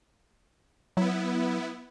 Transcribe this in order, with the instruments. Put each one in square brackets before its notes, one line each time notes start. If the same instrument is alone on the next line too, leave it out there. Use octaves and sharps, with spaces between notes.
[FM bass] F#3 [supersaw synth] B3 E4